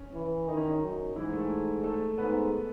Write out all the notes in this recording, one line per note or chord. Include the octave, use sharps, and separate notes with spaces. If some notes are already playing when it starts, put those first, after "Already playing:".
Already playing: C#4
E3
D#3 D#4
C#4
D#4
F#2
G#2 E3 E4
A3 A4
A3 A4
G#2 B3 B4